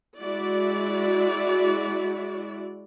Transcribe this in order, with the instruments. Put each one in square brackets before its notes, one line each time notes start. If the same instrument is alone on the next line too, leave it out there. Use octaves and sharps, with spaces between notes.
[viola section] G#3 E4 F#4 D5